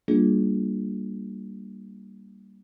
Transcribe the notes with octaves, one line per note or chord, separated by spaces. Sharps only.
G3 A#3 D4 F4 G#4